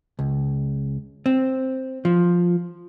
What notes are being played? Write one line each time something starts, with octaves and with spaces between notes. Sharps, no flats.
C#2
C4
F3